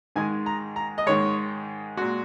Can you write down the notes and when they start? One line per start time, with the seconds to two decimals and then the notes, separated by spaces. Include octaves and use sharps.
0.16 G#2 D#3 G#3 G#5
0.46 A#5
0.76 A#5
0.98 D#5
1.06 G#2 D#3 G#3 C#5
1.97 A#2 G#3 F#4